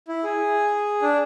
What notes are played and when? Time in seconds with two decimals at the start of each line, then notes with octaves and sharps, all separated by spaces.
0.08 E4
0.24 G#4
1.02 D4